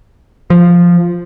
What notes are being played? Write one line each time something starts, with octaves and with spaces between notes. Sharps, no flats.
F3